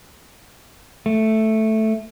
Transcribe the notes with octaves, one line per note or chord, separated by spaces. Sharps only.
A3